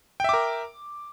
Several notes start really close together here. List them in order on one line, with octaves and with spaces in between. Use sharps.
G5 E5 D6 A#4